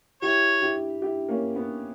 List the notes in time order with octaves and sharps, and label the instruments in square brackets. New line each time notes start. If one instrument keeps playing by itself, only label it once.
[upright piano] E4 G4 [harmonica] C#5
[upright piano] E4 G4
E4 G4
A#3 C#4
B3